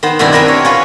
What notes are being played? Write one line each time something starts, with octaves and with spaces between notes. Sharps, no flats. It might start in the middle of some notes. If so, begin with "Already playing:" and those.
D#3 B3 C5
G2 B2 D#3 C4 D4 E4
B3 C4 A#4 E5 G5 G#5
C#5
C#4 F4 B4 C#5